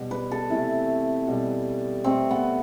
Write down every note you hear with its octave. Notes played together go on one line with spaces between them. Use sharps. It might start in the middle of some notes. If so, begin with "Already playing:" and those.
Already playing: B2 G3
B4
A4
C3 E3 A3 E4
B2 G3
B2 A3 C4
B3